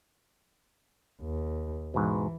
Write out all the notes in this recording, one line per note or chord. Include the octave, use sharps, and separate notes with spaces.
D#2
G#2 B2 E3